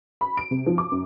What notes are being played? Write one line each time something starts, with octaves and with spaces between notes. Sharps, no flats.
B5
D7
C3
F3
D6
F#2